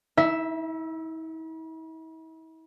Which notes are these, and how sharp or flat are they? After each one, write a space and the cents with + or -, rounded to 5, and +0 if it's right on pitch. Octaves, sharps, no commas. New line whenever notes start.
E4 -45 E5 +0 E6 +0